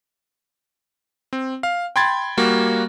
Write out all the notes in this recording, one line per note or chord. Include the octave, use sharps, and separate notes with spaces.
C4
F5
G5 B5 C6 G#6 A6
G3 A#3 F#4